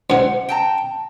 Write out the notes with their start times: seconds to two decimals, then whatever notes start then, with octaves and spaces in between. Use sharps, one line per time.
0.10 C#2 G#2 F#5
0.49 G5 A5 A#5